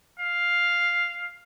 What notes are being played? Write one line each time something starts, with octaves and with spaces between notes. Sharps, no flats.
F5